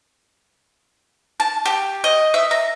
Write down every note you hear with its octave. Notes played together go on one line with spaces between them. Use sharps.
A5
G4
D#5
E5
A#5